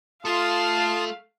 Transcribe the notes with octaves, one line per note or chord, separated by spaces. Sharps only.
A3 F4 A4 F5 A5 C6 D#6